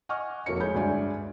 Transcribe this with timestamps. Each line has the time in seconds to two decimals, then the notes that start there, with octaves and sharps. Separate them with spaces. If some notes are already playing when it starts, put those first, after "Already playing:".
0.09 D#5 F#5 G#5 C#6 D6 F6
0.46 F1 A#3 F#4 A4 C#5 C#7
0.60 G#3 G#4 C#5 G#5 B5 G6
0.74 D2 G2 G#3 D5 G#5